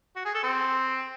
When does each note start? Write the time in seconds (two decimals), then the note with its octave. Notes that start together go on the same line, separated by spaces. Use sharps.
0.16 F#4
0.25 G#4
0.34 A4
0.43 C4